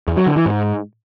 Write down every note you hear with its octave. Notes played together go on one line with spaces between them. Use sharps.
E2
F#3
D3
E3
G#2